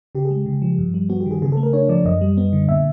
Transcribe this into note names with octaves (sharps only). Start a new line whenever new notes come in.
C#3 G4
G#4
G#3
C#3
F3
G2
G3
B3 F#4
G4
D#3
G#4
C#3 G#4
A3 A4
A#4
D4 C#5
F3 D5
F#2 D#5
G3
B3
D3
A#2 E5